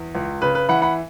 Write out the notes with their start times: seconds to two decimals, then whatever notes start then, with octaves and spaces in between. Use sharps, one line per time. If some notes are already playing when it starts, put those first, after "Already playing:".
Already playing: E2
0.15 C#2
0.42 C#3 B4
0.55 B4
0.69 E3 F#5 B5
0.82 F#5 B5